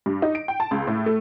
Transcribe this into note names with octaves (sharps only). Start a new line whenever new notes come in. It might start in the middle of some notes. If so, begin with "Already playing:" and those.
G2
D#4
D7
G5
A5
C#2
A2
A3